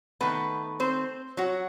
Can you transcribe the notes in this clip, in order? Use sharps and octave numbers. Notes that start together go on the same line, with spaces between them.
D#3 A3 B3 B4
C4 C5
F#3 F#4